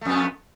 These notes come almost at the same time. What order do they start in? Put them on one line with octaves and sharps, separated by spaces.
A3 F2 B3